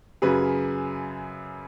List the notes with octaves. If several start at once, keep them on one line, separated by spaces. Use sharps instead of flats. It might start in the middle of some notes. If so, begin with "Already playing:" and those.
F#2 C#3 F#3 G#4 B4